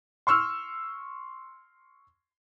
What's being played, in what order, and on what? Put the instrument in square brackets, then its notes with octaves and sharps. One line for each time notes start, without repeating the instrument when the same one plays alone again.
[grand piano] C6 C#6 E6 F6